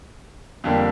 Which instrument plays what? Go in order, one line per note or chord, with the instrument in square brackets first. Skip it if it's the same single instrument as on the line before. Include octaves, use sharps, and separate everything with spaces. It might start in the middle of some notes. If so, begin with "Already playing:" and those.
[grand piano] F2 D3 G3 A#3